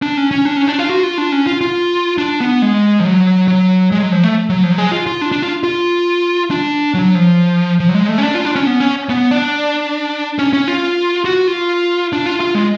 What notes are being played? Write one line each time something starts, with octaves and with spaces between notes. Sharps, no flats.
D4
C#4
C#4
D4
C#4
D4
F4
F#4
F4
D4
C#4
F4
F4
D4
B3
G#3
F3
F#3
F#3
G#3
F#3
F3
A3
F#3
F3
F#3
G#3
F4
F4
D4
D4
F4
F4
D4
F#3
F3
F3
F#3
G#3
A3
C#4
D4
F4
D4
C#4
B3
C#4
B3
D4
C#4
C#4
F4
F#4
F4
D4
F4
F4
G#3